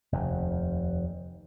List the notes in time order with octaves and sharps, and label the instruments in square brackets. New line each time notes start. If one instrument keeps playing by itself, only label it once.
[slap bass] F1 D#2